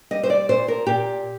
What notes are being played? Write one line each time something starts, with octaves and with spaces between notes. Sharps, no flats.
G3 D#5
C5
D5
A#2 C5
A#4
A#2 G4